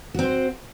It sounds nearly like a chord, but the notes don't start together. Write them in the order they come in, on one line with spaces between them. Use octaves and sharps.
F#4 C4 C5